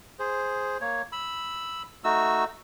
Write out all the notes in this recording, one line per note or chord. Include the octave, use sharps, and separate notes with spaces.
G#4 C5
A#3 C#5
B5 E6
A3 D#4 F#4 E6